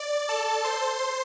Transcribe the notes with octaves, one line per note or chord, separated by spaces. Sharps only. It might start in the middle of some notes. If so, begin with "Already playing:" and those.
Already playing: D5
A4 A5
C5 C6